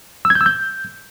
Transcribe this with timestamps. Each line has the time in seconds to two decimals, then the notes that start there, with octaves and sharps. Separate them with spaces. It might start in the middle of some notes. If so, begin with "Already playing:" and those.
0.25 E6
0.30 G#6
0.35 G6
0.41 E6
0.46 G6